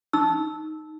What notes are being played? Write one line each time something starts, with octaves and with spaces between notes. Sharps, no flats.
D#4 E6